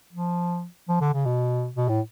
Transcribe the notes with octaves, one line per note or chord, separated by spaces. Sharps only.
F3
F3
D3
C#3
B2
B2
A2